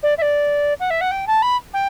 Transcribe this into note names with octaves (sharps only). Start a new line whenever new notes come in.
D5
E5
D5
F#5
E5
F#5
G5
A5
B5
G5